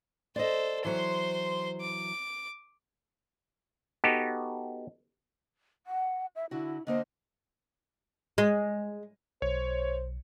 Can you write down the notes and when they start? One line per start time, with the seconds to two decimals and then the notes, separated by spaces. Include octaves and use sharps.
0.36 A4 C5 D5 D#5
0.85 E3 F#3 C5 C6
1.81 D6
4.04 B3 D#4 F#4 G4 A4
5.87 F#5
6.36 E5
6.51 D3 E4 F#4
6.87 D3 A#3 C5 D#5
8.38 G#3
9.42 B1 C5 C#5